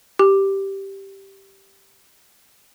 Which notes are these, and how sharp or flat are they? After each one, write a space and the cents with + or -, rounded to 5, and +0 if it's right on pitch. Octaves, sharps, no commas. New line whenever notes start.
G4 -5